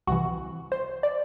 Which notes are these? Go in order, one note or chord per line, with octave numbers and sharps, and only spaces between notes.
C2 C3 E3 F#4
C5
D5